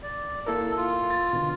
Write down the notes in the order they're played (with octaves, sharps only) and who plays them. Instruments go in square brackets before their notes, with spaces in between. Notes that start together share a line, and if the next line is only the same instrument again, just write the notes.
[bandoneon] D5
[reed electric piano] A#3 E4 A#4 [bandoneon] A4
[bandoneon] F4
[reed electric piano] A6
B2 D3